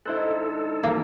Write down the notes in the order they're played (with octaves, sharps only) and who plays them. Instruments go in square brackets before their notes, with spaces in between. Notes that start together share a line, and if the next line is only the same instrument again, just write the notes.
[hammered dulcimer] G#2 D3 D#3 [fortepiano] E4 C5 F#6 [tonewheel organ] A4
[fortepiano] G#1 E3 [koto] A#3